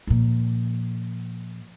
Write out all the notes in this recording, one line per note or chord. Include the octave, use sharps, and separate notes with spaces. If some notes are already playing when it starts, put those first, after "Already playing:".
A#2 F3